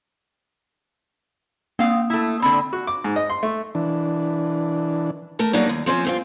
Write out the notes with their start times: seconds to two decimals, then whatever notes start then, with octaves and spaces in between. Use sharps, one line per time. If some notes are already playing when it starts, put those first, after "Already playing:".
1.79 A#3 C4 F5 D#6
2.10 A3 E4
2.42 D3 C4 B5
2.73 F#4
2.87 D6
3.04 G#2
3.16 D#5
3.30 C6
3.43 A3
3.75 E3 D4
5.39 A3 A#4 A5
5.53 F#3 G3 A#3 B3 D4 D#4
5.69 D#2
5.86 F3 C4 C#4
6.05 G2 C4 F4